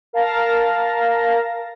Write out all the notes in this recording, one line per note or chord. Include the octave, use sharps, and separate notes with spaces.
A#4 F5 A5 A6 A#6